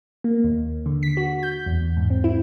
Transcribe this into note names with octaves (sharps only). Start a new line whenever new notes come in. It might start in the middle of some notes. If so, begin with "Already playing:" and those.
A#3
D#2
D3
B6
F#4
G6
E2
G#2
C4
E4